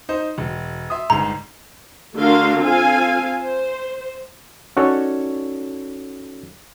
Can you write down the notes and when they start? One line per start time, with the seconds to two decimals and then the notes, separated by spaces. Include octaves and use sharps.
0.09 D#4 C5
0.38 E1
0.90 E5 C6 D#6
1.10 G1 G#2 A#5
2.16 D3 A3 F#4 A#4 F5 C6
2.60 C4 F4 A4 F5 G#5
3.39 C5
4.77 C#4 D#4 F#4 A4 C#5 D5